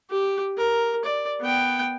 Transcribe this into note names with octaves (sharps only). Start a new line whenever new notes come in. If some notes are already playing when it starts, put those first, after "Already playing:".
G4
A#4
D5
B3 G5